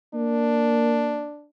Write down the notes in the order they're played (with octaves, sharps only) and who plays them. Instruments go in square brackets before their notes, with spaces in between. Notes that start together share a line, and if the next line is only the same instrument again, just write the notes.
[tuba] A#3 [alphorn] D4